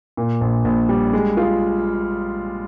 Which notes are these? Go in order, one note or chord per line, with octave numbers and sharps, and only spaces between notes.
A#2
A#1
A#1
G3
G#3
F4